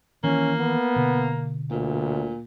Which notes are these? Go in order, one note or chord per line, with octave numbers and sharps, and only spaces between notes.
D#3 E3 A#3 C#4
B3
B2 D3
D2 A#2